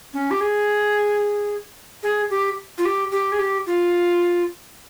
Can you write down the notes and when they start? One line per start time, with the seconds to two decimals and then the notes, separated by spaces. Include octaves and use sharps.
0.14 C#4
0.31 G4
0.41 G#4
2.03 G#4
2.30 G4
2.78 F4
2.85 G4
3.12 G4
3.32 G#4
3.39 G4
3.67 F4